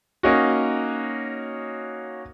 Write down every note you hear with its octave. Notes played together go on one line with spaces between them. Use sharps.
A#3 C#4 D#4 F#4